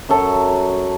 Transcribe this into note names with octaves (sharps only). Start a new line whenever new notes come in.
F#2 F#3 A4